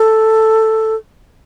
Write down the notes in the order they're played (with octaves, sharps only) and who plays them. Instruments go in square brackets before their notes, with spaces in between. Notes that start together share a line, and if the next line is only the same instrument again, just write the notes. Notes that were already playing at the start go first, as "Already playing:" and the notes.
Already playing: [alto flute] A4